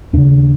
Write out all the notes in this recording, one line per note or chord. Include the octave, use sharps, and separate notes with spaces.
D#2 C#3 D4